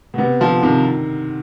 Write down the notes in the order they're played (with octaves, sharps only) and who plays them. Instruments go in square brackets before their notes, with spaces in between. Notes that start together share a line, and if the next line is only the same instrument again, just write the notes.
[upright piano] B2
[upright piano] C3 [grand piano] B3
[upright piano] D3 [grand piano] F3
[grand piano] C3 [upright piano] D#3